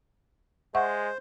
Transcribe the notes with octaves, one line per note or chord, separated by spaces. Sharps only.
G#3 C5 E5 F#5 C#6